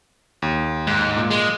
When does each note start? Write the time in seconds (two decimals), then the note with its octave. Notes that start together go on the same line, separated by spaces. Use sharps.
0.42 D#2
0.87 G#2
1.17 A#2
1.31 G#3